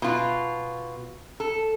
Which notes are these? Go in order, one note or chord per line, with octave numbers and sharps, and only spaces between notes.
B2 F4
A4